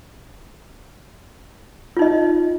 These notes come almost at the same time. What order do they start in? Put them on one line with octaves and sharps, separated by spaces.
F4 D#4 D#5